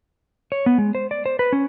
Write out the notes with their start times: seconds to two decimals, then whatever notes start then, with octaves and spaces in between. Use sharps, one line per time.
0.52 C#5
0.66 B3
0.78 G#3
0.95 C5
1.11 D5
1.26 C5
1.39 B4
1.53 C#4